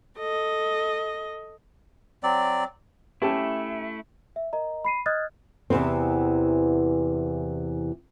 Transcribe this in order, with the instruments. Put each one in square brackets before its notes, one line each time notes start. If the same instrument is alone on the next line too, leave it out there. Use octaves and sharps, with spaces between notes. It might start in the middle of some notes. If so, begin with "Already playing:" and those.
[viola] A4 D#5
[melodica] F#3 C4 D5
[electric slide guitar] A3 E4 [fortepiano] C#4 G4 A5
[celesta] E5
A#4 D#5 A#5
B5 C7 D#7
D#5 D#6 F6 F#6 G#6 A6
[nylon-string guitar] E2 C3 E3 B3 C4